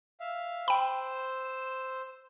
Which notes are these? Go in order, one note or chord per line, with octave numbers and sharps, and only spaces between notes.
E5 F5
C5 G5 B5 E6